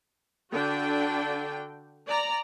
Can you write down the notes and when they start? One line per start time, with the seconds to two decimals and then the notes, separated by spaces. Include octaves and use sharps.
0.51 D3 D4 F#4 G5
2.06 D5 A#5